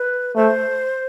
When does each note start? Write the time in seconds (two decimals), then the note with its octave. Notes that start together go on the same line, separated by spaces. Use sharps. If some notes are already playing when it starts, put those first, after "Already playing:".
Already playing: B4
0.36 A3 C5